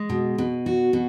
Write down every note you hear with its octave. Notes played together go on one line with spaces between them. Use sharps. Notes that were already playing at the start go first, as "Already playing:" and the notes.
Already playing: G#3
B2
B2
F#4
B2